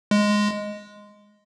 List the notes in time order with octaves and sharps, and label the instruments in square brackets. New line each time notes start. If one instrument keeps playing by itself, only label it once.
[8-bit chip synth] G#3